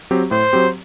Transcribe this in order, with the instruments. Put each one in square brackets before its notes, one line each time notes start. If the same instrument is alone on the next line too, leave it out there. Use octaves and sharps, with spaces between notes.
[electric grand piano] F#3 C4 G4
[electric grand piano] A2 [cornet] C5
[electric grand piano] F#3 C4 G4